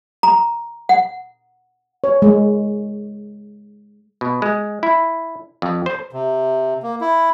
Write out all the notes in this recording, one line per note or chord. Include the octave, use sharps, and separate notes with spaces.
A#5
F#5
C#5
G#3
B2
G#3
E4
F2
C5
C3
A#3
E4